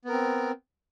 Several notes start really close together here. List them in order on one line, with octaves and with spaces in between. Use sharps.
B3 A#4 C4